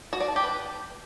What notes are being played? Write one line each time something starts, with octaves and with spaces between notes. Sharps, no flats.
F#4
D5
A5
G4
B4